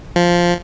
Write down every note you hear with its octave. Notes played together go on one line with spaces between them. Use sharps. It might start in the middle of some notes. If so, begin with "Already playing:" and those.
F3